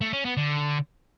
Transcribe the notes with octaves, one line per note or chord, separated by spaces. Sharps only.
A3
C#4
B3
D3